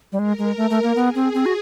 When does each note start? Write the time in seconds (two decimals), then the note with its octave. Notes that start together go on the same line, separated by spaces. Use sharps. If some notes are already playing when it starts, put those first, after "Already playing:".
0.12 G3
0.19 G#3 A#4
0.39 G#3
0.57 A3
0.70 A3
0.83 A#3
0.95 B3 G#4
1.15 C4
1.34 C4
1.46 F#4